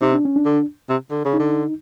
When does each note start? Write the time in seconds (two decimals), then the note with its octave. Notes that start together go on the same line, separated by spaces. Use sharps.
0.01 C3 D#4
0.13 D4
0.25 C#4
0.36 D4
0.45 D3
0.89 C3
1.11 D3
1.25 C#3
1.34 D#4
1.39 D3